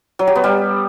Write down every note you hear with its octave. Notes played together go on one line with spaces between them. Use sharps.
F#3
G4
B3
G3